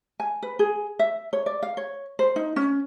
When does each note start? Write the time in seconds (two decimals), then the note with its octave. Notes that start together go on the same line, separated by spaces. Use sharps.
0.20 G#5
0.43 B4
0.59 G#4
0.99 E5
1.33 C#5
1.46 D5
1.63 F5
1.77 C#5
2.19 C5
2.36 D#4
2.56 C#4